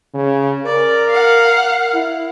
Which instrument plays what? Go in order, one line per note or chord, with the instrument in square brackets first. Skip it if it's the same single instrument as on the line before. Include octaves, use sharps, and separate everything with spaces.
[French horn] C#3
[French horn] A#4 [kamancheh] D5
[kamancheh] F5 F#5
[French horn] E4